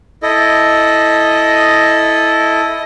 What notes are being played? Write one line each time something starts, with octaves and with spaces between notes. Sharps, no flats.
E4 A4 D#5